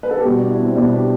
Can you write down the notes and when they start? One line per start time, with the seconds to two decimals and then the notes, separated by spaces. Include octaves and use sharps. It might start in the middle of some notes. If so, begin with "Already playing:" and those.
0.03 B4
0.11 A4
0.18 G4
0.25 B2 G3 F#4
0.38 D4
0.50 E4
0.63 C4
0.75 B2 G3 D4
0.92 G4